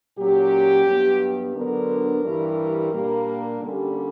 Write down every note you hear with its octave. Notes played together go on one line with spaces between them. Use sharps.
A#2 F#3 C#4 G4
G2 F#3 B3
D3 F#3 B3 D4 A#4
G2 E3 G3
A#2 G3 A#3 D4
D3 G3 A#3 C#4 G4